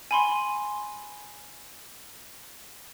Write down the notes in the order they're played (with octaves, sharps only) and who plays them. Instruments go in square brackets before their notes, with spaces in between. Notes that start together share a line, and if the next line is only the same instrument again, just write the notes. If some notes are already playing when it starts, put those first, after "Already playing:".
[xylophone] G#5 B5 C6